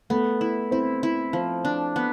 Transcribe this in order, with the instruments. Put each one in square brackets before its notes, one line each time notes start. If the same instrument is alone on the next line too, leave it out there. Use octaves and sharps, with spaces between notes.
[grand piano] A3 [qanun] B3
[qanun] E4
[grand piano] C4 [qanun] E4
[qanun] E4
F3
D4
B3